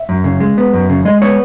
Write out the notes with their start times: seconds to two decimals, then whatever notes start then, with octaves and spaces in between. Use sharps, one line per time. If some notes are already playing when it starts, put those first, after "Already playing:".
Already playing: E5
0.09 F#2
0.24 C#3
0.40 G#3
0.58 B3
0.73 F#2
0.90 C#3
1.05 G#3 D#5
1.22 B3 C#5